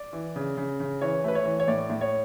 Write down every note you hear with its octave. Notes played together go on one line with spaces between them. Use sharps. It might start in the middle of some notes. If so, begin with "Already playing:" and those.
Already playing: D5
E3
C#3
C#3
C#3
E3 C#5
A3 B4
C#5
E3
C#5
A2 D5
A2
C#5